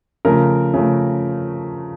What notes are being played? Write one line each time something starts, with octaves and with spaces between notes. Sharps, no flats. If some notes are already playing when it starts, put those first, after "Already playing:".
C#3 F3 A3 A#4
C#3 F3 A3